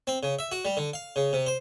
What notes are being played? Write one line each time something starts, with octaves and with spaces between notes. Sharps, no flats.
C4
C#3
E5
F#4
G3
D3
F5
C#3
C3
C5